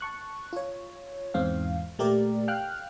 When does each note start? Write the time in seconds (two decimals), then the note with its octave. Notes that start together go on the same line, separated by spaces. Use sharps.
0.01 A5 C#6 F#6
0.53 F4 C#5
1.34 E2 G#2 C4 F5
1.99 A#2 A3 G4 A#4 D5
2.48 F5 G5 F6 F#6